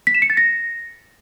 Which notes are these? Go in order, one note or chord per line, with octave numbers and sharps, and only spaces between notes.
B6
E7
C#7
A6
A#6